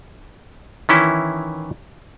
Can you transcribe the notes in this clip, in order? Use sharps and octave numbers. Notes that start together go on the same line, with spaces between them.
D#3 E3 C#4 E4